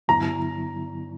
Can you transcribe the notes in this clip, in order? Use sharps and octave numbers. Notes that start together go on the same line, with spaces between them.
G2 D3 F#3 B3 E4 A#5